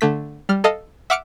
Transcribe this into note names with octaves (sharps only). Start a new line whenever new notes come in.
D3 A3 B6
G3 F6
A4 D#5 F5 A5
E5 F#5 D6 F6 C#7 D7